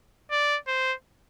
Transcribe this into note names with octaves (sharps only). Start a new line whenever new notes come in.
D5
C5